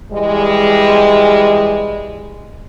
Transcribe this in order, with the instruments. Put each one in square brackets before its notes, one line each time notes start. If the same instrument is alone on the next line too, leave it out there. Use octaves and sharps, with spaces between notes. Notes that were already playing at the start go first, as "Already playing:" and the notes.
[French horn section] E3 G3 G#3